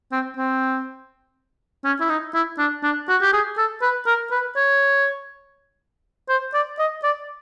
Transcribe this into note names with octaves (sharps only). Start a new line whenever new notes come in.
C4
C4
C#4
E4
D#4
E4
D4
D4
F#4
G4
G#4
A4
B4
A#4
B4
C#5
C5
D5
D#5
D5